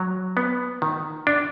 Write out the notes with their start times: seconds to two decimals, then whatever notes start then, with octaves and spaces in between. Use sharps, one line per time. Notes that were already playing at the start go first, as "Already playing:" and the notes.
Already playing: F#3
0.37 B3
0.82 D#3
1.27 D4